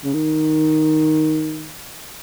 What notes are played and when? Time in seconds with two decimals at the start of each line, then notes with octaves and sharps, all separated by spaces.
0.04 C#3
0.13 D#3